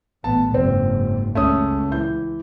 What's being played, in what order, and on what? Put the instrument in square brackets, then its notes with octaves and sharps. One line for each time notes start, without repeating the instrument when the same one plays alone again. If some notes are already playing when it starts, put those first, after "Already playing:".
[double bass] A1 B3 [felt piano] A5
[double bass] F#1 G#2 [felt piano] C4
[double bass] C#2 [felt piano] A3 C#4 D#6
[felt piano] E3 G6